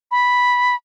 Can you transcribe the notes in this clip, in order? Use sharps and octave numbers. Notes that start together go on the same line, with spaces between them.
B5